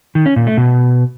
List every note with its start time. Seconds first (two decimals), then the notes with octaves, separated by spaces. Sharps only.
0.15 D#3
0.26 C#4
0.36 A#2
0.47 A3
0.57 B2